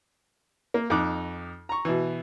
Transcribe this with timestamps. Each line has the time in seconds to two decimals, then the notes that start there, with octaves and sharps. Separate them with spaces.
0.74 A#3
0.90 F2 D#4 D6 F#6
1.69 A#5 C#6
1.85 B2 E3